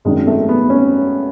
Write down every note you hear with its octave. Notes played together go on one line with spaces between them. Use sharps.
G#1 F#2 D#3 F#3 G#3
A3
B3
C#4